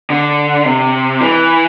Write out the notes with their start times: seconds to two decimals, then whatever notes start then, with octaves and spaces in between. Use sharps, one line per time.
0.10 D3
0.65 C3
1.21 E3